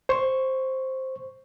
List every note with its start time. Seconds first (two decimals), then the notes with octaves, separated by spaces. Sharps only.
0.09 C5 C#6